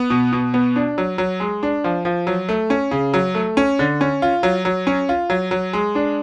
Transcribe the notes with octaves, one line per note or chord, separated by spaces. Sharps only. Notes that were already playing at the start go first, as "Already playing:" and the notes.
Already playing: B3
B2
B2
B3
D4
F#3
F#3
G#3
D4
F3
F3
F#3
A3
C#4
C#3
F#3
A3
C#4
D3
C#4
F4
F#3
F#3
C#4
F4
F#3
F#3
G#3
D4